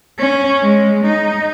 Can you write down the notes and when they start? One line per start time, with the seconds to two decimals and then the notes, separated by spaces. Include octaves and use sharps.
0.19 C#4
0.63 G#3
1.05 D#4